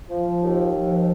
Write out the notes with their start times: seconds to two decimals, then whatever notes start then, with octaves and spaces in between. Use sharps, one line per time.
0.10 F3
0.41 D#2
0.73 F3